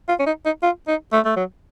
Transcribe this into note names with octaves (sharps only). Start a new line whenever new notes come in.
F4
C#4
D#4
D#4
F4
D#4
A3
A3
F#3